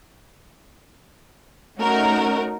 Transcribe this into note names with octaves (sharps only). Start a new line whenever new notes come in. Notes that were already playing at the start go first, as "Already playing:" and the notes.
A3 C#4 D#4 F#4 A#4